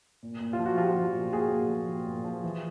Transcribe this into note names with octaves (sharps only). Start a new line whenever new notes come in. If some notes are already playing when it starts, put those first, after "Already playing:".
A#2
A#2
F4
F3
F#4
F3 F4 G4
F3
A#2
A#2 F#4 G#4
A#2
F3
A#2
A#2
F3
E3